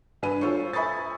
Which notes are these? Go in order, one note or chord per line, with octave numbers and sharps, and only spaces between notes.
G2 B4 G#5 D#7
F4 A4 C5 C#5 C#6
E5 G#5 B5 C#6 D#6 A6